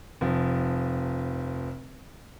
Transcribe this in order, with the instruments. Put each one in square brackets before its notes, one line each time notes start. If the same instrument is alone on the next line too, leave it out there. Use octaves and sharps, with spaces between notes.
[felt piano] F1 F3